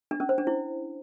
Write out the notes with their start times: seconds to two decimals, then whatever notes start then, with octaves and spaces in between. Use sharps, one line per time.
0.11 D4
0.20 C#4
0.29 C5
0.38 D4
0.47 E4